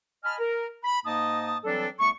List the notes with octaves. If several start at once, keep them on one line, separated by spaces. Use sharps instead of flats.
D#5 G#5 A5 B5 F6
A#4
B5
G#2 A#3 D#4 D#5 A5 D#6
E3 F#3 G3 C4 D4 A4
C2 A3 B3 C#6